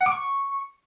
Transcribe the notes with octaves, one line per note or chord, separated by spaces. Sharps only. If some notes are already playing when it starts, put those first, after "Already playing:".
F#5
D6
C#6